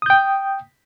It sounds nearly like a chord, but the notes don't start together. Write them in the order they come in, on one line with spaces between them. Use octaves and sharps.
D#6 G6 G5